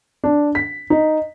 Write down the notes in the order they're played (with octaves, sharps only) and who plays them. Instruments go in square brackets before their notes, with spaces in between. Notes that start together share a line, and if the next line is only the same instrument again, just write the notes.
[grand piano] D4
B6
D#4